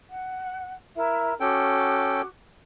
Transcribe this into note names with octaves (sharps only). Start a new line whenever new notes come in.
F#5
E4 A#4 E5
C#4 F#4 A4 G5 D6